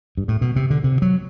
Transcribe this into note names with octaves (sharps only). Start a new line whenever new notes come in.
G2
A2
B2
C3
D3
C3
F#3